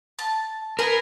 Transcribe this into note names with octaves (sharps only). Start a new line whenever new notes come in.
A5
G#4 A#4 B4